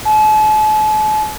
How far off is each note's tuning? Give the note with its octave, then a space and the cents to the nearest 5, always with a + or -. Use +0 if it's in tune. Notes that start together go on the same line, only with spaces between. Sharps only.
A5 -45